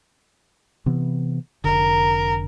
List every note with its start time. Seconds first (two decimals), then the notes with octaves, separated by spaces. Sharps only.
0.86 C3 E3 B3
1.64 F1 B1 D3 A#4